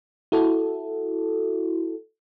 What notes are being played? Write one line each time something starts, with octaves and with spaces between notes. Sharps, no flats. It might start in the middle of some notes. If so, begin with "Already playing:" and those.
E4 F#4 A4